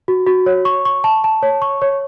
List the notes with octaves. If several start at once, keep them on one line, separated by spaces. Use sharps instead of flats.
F#4
F#4
C#5
C#6
C#6
A5
A5
C#5
C#6
C#5